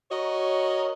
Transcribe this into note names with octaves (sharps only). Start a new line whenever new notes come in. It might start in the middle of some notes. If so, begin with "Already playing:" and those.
F#4 A#4 C#5 D#5